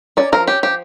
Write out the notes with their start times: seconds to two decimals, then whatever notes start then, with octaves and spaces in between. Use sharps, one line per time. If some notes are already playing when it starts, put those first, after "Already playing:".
0.17 C#4 D5
0.32 F3 A#4
0.47 C#4 G4
0.63 F3 G4